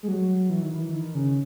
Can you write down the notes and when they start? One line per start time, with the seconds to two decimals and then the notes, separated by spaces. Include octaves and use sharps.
0.03 G#3
0.08 F#3
0.50 E3
0.62 D#3
0.75 E3
0.94 D#3
1.15 C#3